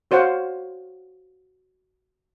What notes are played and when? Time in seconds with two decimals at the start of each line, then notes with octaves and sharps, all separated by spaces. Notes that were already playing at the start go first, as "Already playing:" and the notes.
0.11 F#4 C5 C#5 F5 F#5